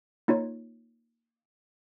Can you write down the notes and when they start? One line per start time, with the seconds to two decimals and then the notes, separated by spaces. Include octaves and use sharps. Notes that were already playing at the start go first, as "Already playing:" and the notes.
0.28 A#3 D#4 F4 C#5